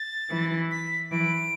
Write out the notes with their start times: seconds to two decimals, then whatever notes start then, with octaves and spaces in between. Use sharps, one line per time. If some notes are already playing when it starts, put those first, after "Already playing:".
Already playing: A6
0.30 E3
0.71 B6
1.12 E3 D7